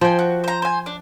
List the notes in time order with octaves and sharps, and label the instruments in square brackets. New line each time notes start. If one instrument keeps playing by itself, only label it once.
[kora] F3 G5 [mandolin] C5 G#5
[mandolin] F#4
C5 A#5
C5 G#5
D4